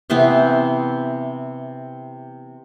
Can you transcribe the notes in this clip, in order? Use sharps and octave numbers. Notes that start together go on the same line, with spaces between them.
C3 E3 B3 C4